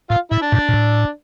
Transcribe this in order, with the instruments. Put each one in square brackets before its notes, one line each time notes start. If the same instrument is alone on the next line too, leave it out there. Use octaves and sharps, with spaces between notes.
[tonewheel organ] A2 [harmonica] F4 F5
[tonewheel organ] A2 [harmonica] E4 E5
[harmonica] D4 D5
[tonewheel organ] G2 A#2
A#2
A2